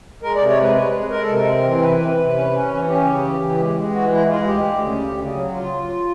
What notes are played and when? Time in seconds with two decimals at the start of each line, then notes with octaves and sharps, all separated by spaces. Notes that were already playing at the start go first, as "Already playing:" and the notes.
0.22 G#3 A#4
0.35 D5
0.40 C3
0.49 C#5
0.58 G#3 B4
0.75 G#3 B4
0.93 G#3
1.10 G#3 A#4
1.22 A4
1.28 C3
1.34 A#4
1.46 C4
1.63 E3
1.82 C3 B4
1.99 C3
2.17 C3
2.35 C#4
2.51 C#4
2.70 E3
2.87 C#4 G4
3.04 C#3
3.22 E3
3.40 E3
3.58 G#3
3.76 G#3
3.93 E3 F#4
4.11 G#3 E4
4.28 G#3 F4
4.46 D2 G4
4.63 D2
4.82 C#3
4.99 D2
5.17 C#3
5.34 F#3
5.52 F4